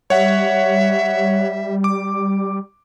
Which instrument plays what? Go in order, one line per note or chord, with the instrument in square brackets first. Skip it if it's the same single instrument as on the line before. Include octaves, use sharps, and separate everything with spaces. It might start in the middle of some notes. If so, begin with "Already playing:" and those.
[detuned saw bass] G3 [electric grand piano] C#5 F#5 [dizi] E5
[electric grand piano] D6